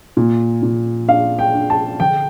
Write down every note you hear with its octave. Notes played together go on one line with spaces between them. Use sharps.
A#2
A#2
D4 F5
G5
D4
A5
D3 G5